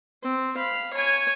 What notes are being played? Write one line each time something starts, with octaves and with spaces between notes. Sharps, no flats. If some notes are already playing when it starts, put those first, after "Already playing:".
C4
F5 B5
C#5 G#5